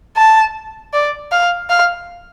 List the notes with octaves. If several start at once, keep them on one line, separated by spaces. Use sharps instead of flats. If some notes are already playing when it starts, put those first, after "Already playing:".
A5
D5
F5
F5